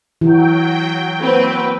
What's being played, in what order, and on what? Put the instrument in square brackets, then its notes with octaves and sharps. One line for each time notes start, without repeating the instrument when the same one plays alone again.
[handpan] E3 [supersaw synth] F#3 G5
[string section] A#3 C4 B4